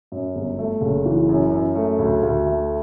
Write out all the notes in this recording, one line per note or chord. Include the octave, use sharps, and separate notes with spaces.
F#2
G1
A3
F#1
E3
F#2
F#2
A3
D2
D2
A3